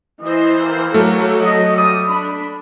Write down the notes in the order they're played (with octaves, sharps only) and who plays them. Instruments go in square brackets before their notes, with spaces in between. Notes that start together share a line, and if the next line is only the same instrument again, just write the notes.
[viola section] E3 E4 C5 [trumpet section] D#5
[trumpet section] A#3 G4 A#4
[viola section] F#3 A4 [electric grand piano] A3
[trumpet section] D#5
G3 D5 D#6
[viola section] D4 [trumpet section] B5